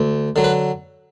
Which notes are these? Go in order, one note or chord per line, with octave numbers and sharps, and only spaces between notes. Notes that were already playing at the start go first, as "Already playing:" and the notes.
Already playing: D2
D3 F#3
B4